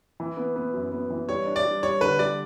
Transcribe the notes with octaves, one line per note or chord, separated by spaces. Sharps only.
E3
B3
B3
F#2
B3
E3
G3 C#5
D4
D5
G3
G3 C#5
D3 B4
G3 D5